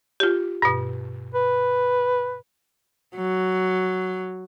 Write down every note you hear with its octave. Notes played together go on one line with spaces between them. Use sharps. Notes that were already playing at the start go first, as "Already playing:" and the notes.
F4 G4
G2 B2
B4
F#3